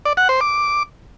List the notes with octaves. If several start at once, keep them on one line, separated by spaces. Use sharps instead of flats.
D5
F#5
C5
D6